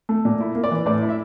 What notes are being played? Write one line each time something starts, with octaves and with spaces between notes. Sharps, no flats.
A3
A#2
E4
A#3
D5
E3
A2 D5
E4
E5